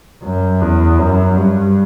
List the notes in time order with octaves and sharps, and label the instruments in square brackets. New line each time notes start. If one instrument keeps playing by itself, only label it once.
[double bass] F#2
E2
F#2
G2